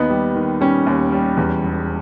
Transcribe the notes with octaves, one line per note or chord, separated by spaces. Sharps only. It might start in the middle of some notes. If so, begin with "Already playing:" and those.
Already playing: D#2 B3 D#4
G3
D#3
G3 C#4
D#2
G3
E2
E1